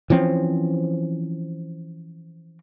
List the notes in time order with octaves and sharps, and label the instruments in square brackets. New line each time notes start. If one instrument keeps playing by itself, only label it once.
[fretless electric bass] E3 F3 C4 C#4